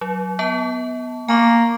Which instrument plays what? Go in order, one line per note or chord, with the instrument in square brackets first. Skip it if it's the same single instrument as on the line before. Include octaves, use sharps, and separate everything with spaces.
[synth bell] F#3
B3 A5
[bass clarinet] A#3 [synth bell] G#5 C#6 D6